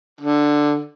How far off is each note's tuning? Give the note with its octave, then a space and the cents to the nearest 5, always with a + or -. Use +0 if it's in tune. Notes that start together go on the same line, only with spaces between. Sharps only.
D3 +5